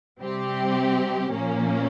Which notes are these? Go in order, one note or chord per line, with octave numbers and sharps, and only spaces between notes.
C3 G3 C4 G4
A#2 F3 A#3 C#4